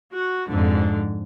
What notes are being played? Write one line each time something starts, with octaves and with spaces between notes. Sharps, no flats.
F#4
F2 G#2 D3